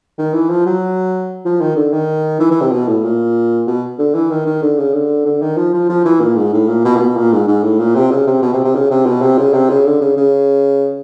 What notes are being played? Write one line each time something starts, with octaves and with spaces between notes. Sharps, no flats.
D#3
E3
F3
F#3
F3
D#3
D3
D#3
E3
E3
C3
B2
A2
A#2
B2
D3
E3
D#3
D#3
D3
C#3
D3
D3
D#3
F3
F3
F3
E3
A#2
G#2
A2
A#2
B2
A#2
B2
A#2
G#2
G#2
A2
A#2
C3
C#3
C3
B2
C3
C3
C#3
C3
B2
C3
C#3
C3
C#3
D3
C#3
C#3